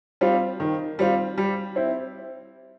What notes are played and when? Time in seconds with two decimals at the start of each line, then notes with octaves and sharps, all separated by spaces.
0.21 G3 C4 F4
0.60 D#3
0.99 G3 C4 F4
1.38 G3
1.76 C4 E4